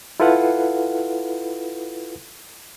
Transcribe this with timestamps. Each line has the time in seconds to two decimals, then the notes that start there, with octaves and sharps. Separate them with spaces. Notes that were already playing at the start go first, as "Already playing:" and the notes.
0.20 E4 F4 A4 B4 F5 F#5